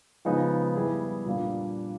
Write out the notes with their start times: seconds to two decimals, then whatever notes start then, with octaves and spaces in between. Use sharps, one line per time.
0.25 C#3 F3 G#3 B3 D#4
0.75 G3 B3 E4 G#4 B4
1.26 A#2 G3 A#3 D4